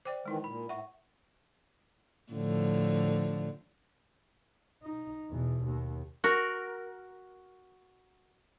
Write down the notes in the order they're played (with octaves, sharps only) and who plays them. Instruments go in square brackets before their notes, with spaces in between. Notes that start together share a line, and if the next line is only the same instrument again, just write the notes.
[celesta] C5 [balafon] D5 G5 D6
[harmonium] D#3 E3 [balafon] G#3 D#4 E4
[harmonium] A#2 [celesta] B5
[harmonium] A2 [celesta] E5 [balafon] F#5 C#6
[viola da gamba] A2 D3 F3
[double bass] D#4
E2 B2
D#2
[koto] F#4 A#4